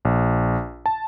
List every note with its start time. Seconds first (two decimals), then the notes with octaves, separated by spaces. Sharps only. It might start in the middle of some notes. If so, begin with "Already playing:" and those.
0.05 A#1
0.86 A5